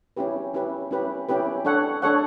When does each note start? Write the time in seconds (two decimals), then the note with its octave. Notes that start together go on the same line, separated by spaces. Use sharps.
0.17 C#4 E4 G4 B4
0.54 C#4 E4 G4 B4
0.91 C#4 E4 G4 B4
1.29 C#4 E4 G4 B4
1.65 D4 A4 C#5 F#5
2.02 D4 A4 C#5 F#5